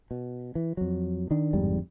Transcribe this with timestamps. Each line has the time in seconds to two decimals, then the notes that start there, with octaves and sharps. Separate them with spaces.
0.11 B2
0.55 E3
0.77 F2 F#3
1.31 D#3 D4
1.53 G1 F2 G#2 G3